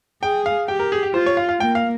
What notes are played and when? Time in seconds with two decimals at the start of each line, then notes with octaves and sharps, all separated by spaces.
0.23 G#4 G5
0.46 F5
0.68 G4 G5
0.79 A#4
0.92 G#4
1.03 G4
1.14 F4 C5
1.26 C#5
1.37 F5
1.49 F5
1.60 A#3 G5
1.75 F5